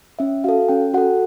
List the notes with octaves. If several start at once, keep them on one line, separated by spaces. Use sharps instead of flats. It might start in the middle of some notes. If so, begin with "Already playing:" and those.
C#4 E5
F#4 A4 F5
C#4 G5
F#4 A4 F#5